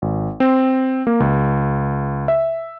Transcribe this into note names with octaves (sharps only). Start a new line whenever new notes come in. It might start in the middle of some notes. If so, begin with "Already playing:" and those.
G#1
C4
A#3
C#2
E5